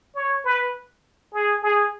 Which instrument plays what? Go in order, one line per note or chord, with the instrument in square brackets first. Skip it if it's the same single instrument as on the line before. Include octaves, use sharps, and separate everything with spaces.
[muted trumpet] C#5
B4
G#4
G#4